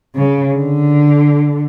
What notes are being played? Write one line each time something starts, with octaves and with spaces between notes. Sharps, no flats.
C#3
D3